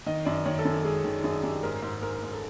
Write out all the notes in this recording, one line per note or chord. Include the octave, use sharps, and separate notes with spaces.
D#3 D#5
F#2 D5
D#3 C#5
A4
F#2
A4
G#3 G#4
D#3
F#2 G#4
F#2 G4
G#2 A#4
G#2
G#2 A#4
G#2
A4